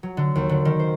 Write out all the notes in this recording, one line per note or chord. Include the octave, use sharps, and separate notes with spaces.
F#3
D3
D#2
D3
D#3
C5